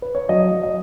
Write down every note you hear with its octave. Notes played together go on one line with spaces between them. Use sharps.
B4
C#5
F#3 D#5
F#3
D#5